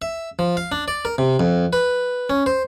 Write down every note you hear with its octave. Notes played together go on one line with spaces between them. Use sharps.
E5
F3
F5
D4
D5
A#4
C3
F2
B4
C#4
C5